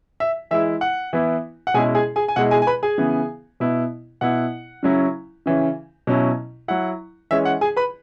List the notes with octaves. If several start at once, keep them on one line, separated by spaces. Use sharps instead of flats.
E5
E3 G#3 E4 E5
F#5
E3 B3 E4
F#5
B2 G#3 C#4 E4 G#4 G#5
G#4 G#5
G#4 G#5
G#5
B2 G#3 E4 F#5
G#4 G#5
G#5
B4 B5
G#4 G#5
C#3 E3 B3
B2 B3 E4
B2 B3 E4 F#5
C#3 F#3 C#4 E4
C#3 E3 C#4
B2 F#3 C#4 E4
F#3 E4 F#5
E3 G#3 C#4 E5
F#5
G#4 G#5
B4 B5